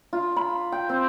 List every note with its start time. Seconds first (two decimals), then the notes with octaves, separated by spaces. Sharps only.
0.13 F4
0.36 B5
0.72 G5
0.89 C4